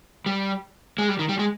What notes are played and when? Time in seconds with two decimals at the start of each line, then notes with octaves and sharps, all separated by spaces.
0.26 G3
0.98 G#3
1.09 G3
1.19 D#3
1.29 G3
1.39 G#3